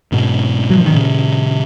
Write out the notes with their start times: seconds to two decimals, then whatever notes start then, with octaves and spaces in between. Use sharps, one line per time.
0.12 G#2 B2
0.70 F#3
0.77 F3
0.86 D#3
0.94 A#2 C#3